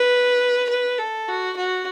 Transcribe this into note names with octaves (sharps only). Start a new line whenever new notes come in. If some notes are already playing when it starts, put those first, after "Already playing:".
Already playing: B4
B4
A4
F#4
F#4